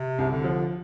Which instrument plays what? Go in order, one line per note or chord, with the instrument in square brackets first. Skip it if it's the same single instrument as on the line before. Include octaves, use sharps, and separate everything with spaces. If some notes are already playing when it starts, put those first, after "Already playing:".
Already playing: [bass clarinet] C3
[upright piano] C2
[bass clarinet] D3
[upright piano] F3